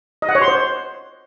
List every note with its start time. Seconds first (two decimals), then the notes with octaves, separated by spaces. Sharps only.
0.22 D#5
0.29 F#5
0.35 C#5
0.41 C6
0.48 C5